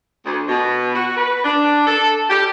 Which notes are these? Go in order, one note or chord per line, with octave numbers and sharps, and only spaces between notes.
D2
B2
F#4
B4
D4
A4
G4